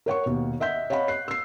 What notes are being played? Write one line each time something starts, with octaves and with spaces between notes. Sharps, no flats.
A#4 C#5 F#5 C#6
D#2 B2
D#5 E5 F#5 G6 B6
C#5 D#5 F5 F#5 B5
F#6 C7
E6 C7